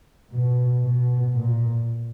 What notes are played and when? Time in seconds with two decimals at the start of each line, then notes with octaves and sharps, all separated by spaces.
0.32 B2
0.83 B2
1.33 A#2